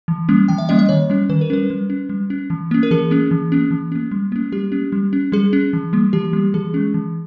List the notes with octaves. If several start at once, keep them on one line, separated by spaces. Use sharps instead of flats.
E3
G3 A#3 C#4
E3 G5
E5
G3 A#3 C#4 D#5
D#5
D#3 C#5
G3 C#4
D#3 B4
A#4
G3 C#4 B4
G3
C#4
G3
C#4
E3
A#3 C#4
A#4
E3 G#4
A#3 C#4
E3
A#3 C#4
E3
A#3 C#4
G3
A#3 C#4
G3 G4
A#3 C#4
G3
C#4
G3 G#4
C#4
E3
G3 A#3
E3 G4
G3 A#3
E3 G#4
G#3 C#4
E3